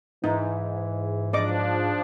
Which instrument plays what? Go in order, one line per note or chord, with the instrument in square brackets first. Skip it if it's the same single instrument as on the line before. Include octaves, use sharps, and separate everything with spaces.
[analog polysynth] G#2 [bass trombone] E3 [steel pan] D#4
[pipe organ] F3 D4 [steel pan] D5 D#5 D6